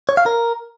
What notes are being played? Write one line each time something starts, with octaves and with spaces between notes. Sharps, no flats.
C#5
F5
A#4